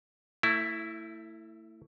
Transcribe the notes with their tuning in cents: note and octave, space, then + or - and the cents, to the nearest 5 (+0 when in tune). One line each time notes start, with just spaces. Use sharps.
A3 +30 E4 +0